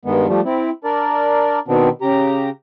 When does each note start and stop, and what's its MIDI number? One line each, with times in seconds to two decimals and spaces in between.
0.05 0.27 43
0.05 0.27 51
0.05 0.27 56
0.05 0.27 59
0.28 0.41 53
0.28 0.41 55
0.28 0.41 57
0.45 0.70 60
0.45 0.70 64
0.84 1.59 62
0.84 1.59 70
0.84 1.59 74
1.68 1.89 47
1.68 1.89 51
1.68 1.89 59
1.68 1.89 60
1.68 1.89 62
2.02 2.49 49
2.02 2.49 67
2.02 2.49 82